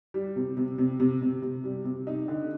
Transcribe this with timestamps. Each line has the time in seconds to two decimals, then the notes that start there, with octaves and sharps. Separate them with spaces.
0.14 G3
0.36 C3
0.57 C3
0.78 C3
1.00 C3
1.21 C3
1.42 C3
1.64 G3
1.84 C3
2.07 D#4
2.28 D3